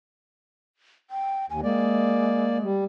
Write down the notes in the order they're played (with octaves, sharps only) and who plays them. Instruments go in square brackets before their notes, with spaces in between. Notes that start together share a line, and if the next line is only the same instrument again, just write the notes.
[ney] G5
[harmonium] D#2 [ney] G#5
[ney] G#3 [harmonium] A#3 D5
[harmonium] G3